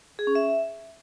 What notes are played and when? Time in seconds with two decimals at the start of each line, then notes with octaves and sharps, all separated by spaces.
0.19 G#4
0.27 C#4
0.35 E5